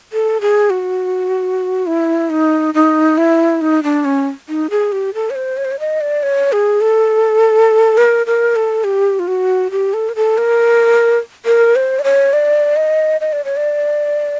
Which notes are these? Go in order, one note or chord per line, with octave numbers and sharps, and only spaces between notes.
A4
G#4
F#4
E4
D#4
D#4
E4
D#4
D4
C#4
D#4
G#4
G4
A4
C#5
C5
C#5
C5
C#5
D#5
D5
C#5
G#4
A4
A#4
A#4
A4
G4
F4
F#4
G4
A4
A#4
A4
A#4
A#4
C5
D5
C#5
D5
D#5
D#5
D5
C#5
D5